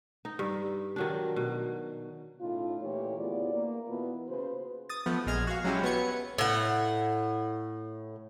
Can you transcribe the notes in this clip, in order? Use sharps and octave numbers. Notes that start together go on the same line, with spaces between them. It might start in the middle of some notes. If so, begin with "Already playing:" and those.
D#4
G2
D#3 F#3 D4
B2
A2 C#3 D#4 F4
A#2 E3 A3 G4 C#5
D2 B3 E4 F4 G#4 D5
A#3
B2 E3 B3 E4 F4 B4
C#3 F#4 B4 C5
D#6 A6
F3 A3 B3
A#1 G#3 F6 G#6
F#4 F5
F#3 G#3 C#4 E4 G4
B3 B4 C#5 G#6 C#7
A2 F#5